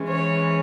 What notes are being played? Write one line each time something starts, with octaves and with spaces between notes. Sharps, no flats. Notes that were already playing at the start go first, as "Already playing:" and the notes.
Already playing: E3 G#3 C#4
C#5